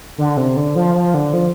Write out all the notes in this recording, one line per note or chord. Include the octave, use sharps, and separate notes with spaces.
D3
C3
D3
F3
F3
D3
F3